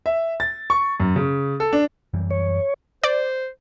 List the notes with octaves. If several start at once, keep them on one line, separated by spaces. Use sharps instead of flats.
E5
A6
C#6
F#2
C#3
A4
D4
F#2 E3 G3
C#5
C5 D5